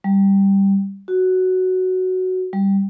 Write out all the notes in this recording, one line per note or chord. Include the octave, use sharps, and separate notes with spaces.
G3
F#4
G3